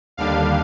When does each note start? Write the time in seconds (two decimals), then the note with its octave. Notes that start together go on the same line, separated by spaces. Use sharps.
0.17 D#2 D3 G3 D4 F5